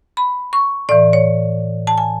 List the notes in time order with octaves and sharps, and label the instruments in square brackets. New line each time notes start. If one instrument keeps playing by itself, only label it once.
[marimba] B5
C#6
A2 E3 D5
C#5
A5
G#5